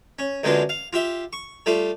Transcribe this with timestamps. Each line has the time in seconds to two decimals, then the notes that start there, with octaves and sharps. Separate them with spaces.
0.19 C#4
0.43 F#2 D3 G#3 B3 D4 F4
0.69 F5
0.93 F4 G4 E5
1.33 C#6
1.66 G3 A3 F4